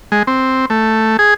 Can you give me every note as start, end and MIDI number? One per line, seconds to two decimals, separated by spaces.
0.12 0.23 56
0.27 0.66 60
0.70 1.17 57
1.19 1.34 68